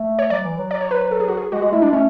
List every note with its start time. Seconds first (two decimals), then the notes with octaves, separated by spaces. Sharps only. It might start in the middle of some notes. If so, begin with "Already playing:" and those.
Already playing: A3
0.19 C#5
0.30 F#3 D5
0.44 E3
0.58 F#3
0.71 D5
0.81 C#5
0.91 B4
1.01 B4
1.11 A4
1.20 G#4
1.28 F#4
1.37 G#4
1.52 G#3 F#4
1.62 G#3 F#4
1.72 A3 E4
1.82 G#3 D4
1.92 A3 C#4